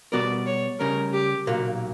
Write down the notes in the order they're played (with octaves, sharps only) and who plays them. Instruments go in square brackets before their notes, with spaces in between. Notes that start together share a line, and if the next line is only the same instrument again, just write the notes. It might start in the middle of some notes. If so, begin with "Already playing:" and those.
[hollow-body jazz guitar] B2 G3 B3 F#4 A#4 [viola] D5
[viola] C#5
[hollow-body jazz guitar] C#3 G3 C#4 [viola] A#4
[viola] G4
[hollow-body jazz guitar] B1 A#2 A#3 [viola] F#4